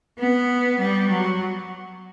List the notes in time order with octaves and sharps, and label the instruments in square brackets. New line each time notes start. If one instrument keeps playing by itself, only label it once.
[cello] B3
G3
F#3